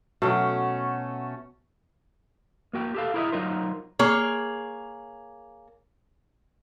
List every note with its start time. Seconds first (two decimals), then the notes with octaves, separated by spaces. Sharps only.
0.22 B2 F#3 A3 C#4
2.73 A#3 F#4 G5
2.94 G4 A4 F5
3.14 E4 G#4 A#4 C5 D#5 E5
3.32 F#3 D#4 F4 A#4 C5
3.99 A#3 G#4 C#5